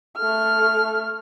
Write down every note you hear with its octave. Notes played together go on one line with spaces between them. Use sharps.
A3 F6